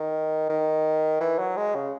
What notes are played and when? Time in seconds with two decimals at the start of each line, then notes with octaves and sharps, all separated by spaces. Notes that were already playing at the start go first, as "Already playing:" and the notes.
Already playing: D#3
0.50 D#3
1.21 E3
1.39 F#3
1.57 G#3
1.75 C#3